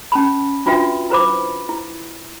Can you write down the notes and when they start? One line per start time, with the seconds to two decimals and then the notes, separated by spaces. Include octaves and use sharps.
0.12 C#4 A5 B5
0.66 D4 F4 F#4 B4 E5 G5
1.10 E4 B4 C5 B5 D6
1.69 E4